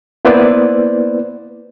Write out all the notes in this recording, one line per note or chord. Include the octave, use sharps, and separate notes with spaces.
A#3 B3 E4 B4 C5 D5